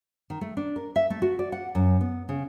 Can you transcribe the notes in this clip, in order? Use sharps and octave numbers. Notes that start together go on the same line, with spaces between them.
D#3
A3
D4
A#4
E5
A3
F#4
D5
F#5
F#2
B3
C#3